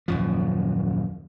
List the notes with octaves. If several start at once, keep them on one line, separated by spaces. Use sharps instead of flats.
D#1 F#2 F3